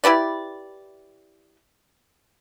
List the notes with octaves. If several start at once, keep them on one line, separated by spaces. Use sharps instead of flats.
E4 G4 B4 D5